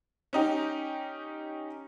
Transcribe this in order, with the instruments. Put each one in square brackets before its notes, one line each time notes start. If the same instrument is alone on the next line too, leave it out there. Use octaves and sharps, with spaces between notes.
[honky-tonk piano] C#4 D#4 G4